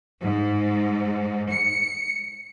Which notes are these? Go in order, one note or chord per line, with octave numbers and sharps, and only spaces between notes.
G#2
C#7